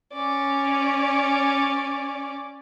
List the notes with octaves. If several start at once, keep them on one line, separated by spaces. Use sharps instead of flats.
C#4 D5